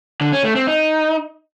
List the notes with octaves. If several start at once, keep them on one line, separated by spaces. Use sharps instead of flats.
D3
C#4
A3
C4
D#4